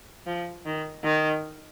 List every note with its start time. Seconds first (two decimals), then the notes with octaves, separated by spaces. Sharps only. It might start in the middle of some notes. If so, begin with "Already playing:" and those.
0.26 F3
0.65 D#3
1.04 D#3